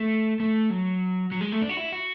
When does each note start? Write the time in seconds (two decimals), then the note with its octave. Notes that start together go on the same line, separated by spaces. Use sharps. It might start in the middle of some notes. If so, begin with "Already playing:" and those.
Already playing: A3
0.40 A3
0.70 F#3
1.32 F#3
1.41 G#3
1.52 A3
1.62 D4
1.69 F#4
1.77 E4
1.92 F#4